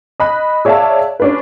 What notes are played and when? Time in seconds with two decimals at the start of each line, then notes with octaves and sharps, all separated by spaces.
0.20 D#5 B5 F#6
0.65 G#4 C#5 D5 E5 F5 A5
1.20 C#4 D4 B4